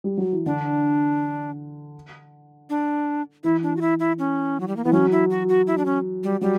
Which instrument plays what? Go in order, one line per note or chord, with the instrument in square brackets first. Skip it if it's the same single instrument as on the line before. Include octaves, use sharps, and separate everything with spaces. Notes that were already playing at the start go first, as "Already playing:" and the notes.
[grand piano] G3
F#3
E3
[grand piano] D3 [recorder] D4
[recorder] D4
[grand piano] E3 [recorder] E4
[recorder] D4
F#4
E4
E4
C#4
F#3
G3
A#3
[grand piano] E3 [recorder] B3
[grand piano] F#3 [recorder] C#4
[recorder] E4
F#4
F#4
E4
D4
C#4
G3
[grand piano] F#3 [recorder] G3